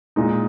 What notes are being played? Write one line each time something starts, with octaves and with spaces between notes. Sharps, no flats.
A#2 G#3 D#4